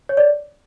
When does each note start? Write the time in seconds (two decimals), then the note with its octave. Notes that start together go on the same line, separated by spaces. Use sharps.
0.09 C#5
0.17 D5